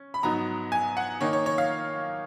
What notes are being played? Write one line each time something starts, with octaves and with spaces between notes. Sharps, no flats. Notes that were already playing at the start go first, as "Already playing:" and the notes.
Already playing: C#4
B5
G#2 F#3 B3 D#4 A#5
G#5
F#5
D#3 A#3 D#4 C#5
C#5
C#5
F5